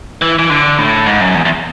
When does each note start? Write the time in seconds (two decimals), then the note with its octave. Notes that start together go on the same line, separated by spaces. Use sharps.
0.22 E3
0.39 E3
0.50 D3
0.78 A2
1.06 G#2
1.21 F#2
1.35 E2
1.45 E2